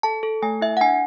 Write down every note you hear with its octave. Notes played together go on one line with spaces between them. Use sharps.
A4 A5
A4
A3 G#5
E4 E5
F#5
D4 G#5